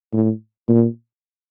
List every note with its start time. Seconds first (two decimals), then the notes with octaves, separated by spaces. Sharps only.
0.13 A2
0.69 A#2